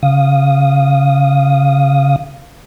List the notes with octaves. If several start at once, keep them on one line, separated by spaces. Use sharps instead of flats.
C#3 F5 D#6